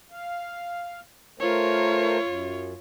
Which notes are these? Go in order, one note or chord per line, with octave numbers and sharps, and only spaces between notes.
F5
A3 F4 A#4 C5 C#5
F#2